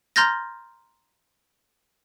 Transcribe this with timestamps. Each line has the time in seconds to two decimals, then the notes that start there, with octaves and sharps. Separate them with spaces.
0.16 A#5 C6 F6 G6 A6 A#6